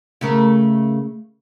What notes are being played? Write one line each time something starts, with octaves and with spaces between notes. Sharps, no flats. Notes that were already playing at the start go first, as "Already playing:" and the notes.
C#3 A3 A#4